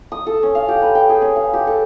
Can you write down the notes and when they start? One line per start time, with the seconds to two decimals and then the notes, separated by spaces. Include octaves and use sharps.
0.12 D#6
0.27 A4
0.43 C#4
0.55 F5
0.68 G4
0.82 B4
0.95 G5
1.09 G#4
1.22 C#4
1.36 F5
1.53 G4
1.67 A4